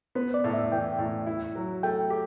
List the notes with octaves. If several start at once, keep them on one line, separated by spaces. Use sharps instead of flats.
B3 C5
D5
A2
E5
E3 G5
A2
E4
F#3
A3 G5
G4